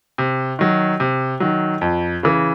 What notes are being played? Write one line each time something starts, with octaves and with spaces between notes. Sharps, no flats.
C3
D#3 F#3
C3
D#3 F#3
F2
C#3 E3